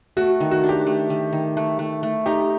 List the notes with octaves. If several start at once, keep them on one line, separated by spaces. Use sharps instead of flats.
A3 F#4
D#3
F#4
D4
G4
A3
D#3
D#3
A3
A3
A3
D#4 G4